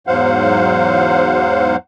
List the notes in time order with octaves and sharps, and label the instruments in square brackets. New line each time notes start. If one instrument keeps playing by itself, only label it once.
[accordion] E2 G#2 F#3 C5 F5 F#5